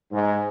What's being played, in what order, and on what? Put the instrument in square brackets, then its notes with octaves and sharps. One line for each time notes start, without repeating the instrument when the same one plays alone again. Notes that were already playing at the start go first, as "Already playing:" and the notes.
[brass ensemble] G#2